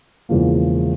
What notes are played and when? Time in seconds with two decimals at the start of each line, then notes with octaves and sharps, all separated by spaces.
0.29 E1 E2 C#3 F3 A#3